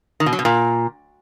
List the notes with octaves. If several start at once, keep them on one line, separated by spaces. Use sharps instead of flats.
D#3
B2
F#3
B2
A#2